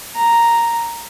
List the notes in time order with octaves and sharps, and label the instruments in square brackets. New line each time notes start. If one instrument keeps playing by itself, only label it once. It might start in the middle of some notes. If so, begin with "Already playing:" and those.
[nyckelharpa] A#5